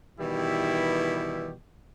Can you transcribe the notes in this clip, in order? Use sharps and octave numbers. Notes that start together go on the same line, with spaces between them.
B2 D#3 E3 G3 E4 G4